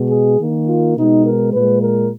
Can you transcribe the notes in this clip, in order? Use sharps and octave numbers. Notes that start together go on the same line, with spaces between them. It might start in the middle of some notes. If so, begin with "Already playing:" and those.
Already playing: B2 G#3
G#4
D#3 A#3
F4
B2 G#3 D#4
A#4
A#2 G#3 B4
A#4